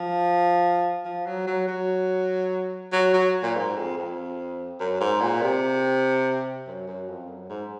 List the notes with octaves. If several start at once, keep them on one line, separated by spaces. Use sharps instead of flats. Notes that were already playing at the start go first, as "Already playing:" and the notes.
Already playing: F3
F3
F#3
F#3
F#3
F#3
F#3
A#2
G#2
F2
F2
F#2
G#2
A#2
C3
F#2
F#2
F2
F#2
G#2